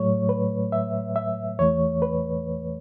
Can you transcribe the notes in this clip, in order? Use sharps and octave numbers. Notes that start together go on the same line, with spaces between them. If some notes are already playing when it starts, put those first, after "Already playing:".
Already playing: A2 F#3 A3 C#5
B4
E5
E5
E2 E3 A3 C#5
B4